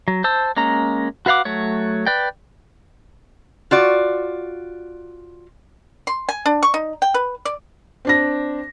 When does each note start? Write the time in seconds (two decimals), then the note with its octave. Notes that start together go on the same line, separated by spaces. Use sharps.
0.08 F#3
0.24 C5 A5 E6
0.57 G#3 A#3 C#4 A#5
1.26 F#4 B4 F5 F#5 D6
1.45 F#3 A3 C#5
2.06 B4 D5 G5
3.71 F4 F#4 D5
6.07 C6
6.29 G#5
6.46 D4
6.63 C#6
6.74 D#4
7.02 G5
7.14 B4
7.45 D5
8.05 C4 D4 A#6